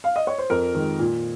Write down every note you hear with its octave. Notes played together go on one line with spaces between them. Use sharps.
F5
D#5
C#5
C5
F2 A#4
D#3 G#3
A#2